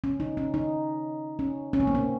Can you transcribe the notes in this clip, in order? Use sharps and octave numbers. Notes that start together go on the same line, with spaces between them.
C#4
D#4
C#4
D#4
C#4
C#4
C4
A#3
C4